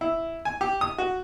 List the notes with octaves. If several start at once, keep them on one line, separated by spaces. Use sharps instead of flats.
E4
G#5
G4
D#6
F#4